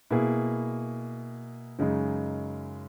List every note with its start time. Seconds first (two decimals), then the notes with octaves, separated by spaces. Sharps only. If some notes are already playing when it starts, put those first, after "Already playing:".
0.10 B2 A#3 E4 G#4
1.79 F#2 C#3 G#3 D#4